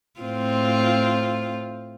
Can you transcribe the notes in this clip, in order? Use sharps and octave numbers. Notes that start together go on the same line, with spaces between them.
A2 C4 F4